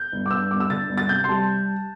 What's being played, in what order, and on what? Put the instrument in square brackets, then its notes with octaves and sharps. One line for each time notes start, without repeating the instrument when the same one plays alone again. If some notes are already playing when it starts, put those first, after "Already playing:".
Already playing: [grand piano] G6
G1
D6
G2 E6
G1 D6
E6
D3 A6
G1
A6
C3 G6
C6
G3 A5